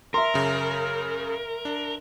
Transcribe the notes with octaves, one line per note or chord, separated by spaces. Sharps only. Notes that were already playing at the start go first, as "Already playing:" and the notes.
A#4 E5 C6
F#2 C#3
D4